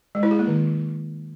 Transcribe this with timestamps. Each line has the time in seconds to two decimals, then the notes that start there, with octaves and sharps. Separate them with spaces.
0.15 G#3
0.23 E4
0.31 G#4
0.39 A#3
0.47 D#3